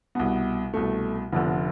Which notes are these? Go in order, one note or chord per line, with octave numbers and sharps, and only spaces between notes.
C2 B2 B3
C2 B2 A3
F1 F2 D3 B3